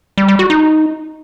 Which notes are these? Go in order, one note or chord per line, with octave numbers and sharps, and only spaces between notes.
G3
G3
F#4
D#4